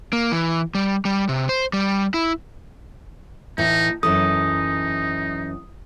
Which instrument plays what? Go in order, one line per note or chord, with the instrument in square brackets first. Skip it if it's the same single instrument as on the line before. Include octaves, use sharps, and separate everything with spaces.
[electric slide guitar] A#3
E3
G3
G3
C3
C5
G3
E4
[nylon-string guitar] A2 E3 [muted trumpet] D#4
[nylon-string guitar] F#2 E3 A4 [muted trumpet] D#4 [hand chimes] D#6